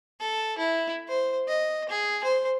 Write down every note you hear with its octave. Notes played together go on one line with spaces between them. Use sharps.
A4
E4
C5
D#5
G#4
C5